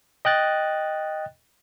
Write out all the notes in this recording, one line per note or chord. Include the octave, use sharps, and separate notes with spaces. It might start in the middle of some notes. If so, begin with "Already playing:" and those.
D#5 G5 F#6 A6